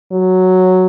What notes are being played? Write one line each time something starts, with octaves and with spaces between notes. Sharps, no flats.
F#3